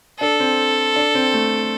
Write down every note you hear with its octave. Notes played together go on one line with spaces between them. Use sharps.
D4 A4
C4
D4
C4
A3